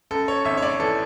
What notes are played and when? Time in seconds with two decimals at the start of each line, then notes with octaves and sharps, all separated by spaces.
0.11 F#2 A4
0.28 C#5
0.45 G#1 E5
0.57 C#5
0.62 D5
0.80 E3 A4